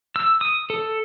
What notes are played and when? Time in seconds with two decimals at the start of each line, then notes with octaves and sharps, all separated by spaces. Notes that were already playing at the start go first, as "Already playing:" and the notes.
0.16 E6
0.41 D#6
0.70 A4